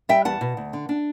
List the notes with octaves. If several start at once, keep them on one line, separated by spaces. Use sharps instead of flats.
G3 E5 G5
E2 F#5 A5
B2
D2
D3
D4